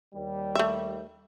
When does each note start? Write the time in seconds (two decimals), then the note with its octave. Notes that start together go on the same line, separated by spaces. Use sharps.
0.15 D#2 G3
0.55 A3 E5